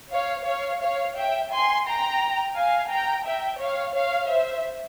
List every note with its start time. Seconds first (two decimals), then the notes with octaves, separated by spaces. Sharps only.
0.12 C#5 F5
0.46 C#5 F5
0.81 C#5 F5
1.16 E5 G5
1.51 G#5 C6
1.86 G5 A#5
2.55 F5 G#5
2.90 G5 A#5
3.25 E5 G5
3.60 C#5 F5
3.95 C#5 F5
4.30 C5 E5